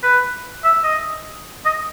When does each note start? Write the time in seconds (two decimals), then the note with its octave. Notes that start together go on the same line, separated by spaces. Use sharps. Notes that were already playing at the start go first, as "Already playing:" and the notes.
0.03 B4
0.64 E5
0.84 D#5
1.65 D#5